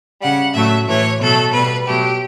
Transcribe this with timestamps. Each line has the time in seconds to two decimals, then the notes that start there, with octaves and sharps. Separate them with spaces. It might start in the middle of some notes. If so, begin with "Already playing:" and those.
0.21 C#3 G3 F#5
0.54 A2 F#3 A3 E5
0.87 A2 E3 A3 C#5
1.21 B2 F#3 A3 A4
1.53 B2 G3 B4
1.87 B2 F#3 A3 G4